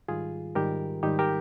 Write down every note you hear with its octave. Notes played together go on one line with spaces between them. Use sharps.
G#2 D#3 G3 F4 G#4
G#2 D#3 G3 G4 A#4
G#2 D#3 G3 D#4 G4
G4 A#4